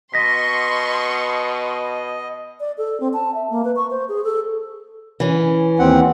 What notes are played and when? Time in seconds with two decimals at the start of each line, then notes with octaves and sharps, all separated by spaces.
0.14 B2 D#5 C6 C#6 A#6 B6
2.60 D5
2.78 A4
3.00 C4
3.13 A5
3.35 E5
3.50 A#3
3.64 B4
3.76 C#6
3.90 C5
4.09 G#4
4.24 A4
5.20 E3 C#4
5.79 D#2 C4 F#5